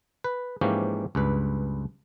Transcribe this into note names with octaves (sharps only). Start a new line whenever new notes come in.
B4
G#2 E3 F3 A#3 C#4 G4
C#2 G2 B4